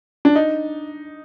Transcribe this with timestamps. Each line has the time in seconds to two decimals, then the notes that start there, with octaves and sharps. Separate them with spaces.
0.25 D4
0.36 D#4